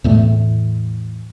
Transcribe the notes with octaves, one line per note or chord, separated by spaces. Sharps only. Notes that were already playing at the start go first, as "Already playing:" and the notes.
E2 A2 A3